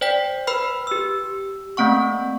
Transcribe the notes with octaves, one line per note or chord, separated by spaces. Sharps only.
C5 D5 G5 B6
B4 B5 F6
G4 E6
A3 A#3 C4 F#5 C#6